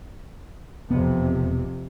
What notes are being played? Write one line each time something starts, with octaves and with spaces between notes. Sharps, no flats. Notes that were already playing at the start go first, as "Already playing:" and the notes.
E1 F2 C3 B3